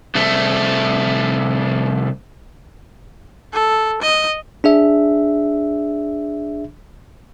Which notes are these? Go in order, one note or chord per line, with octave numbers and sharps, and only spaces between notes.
C2 A3
A4
D#5
D4 G#4 E5